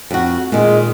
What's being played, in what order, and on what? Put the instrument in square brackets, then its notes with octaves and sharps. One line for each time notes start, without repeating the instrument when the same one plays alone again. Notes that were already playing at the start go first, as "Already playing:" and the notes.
[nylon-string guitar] F2 F#4
[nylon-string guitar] A#2 D#3 [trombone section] G#3